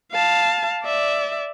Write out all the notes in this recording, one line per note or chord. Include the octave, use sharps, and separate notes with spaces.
F5 A5
D5 E5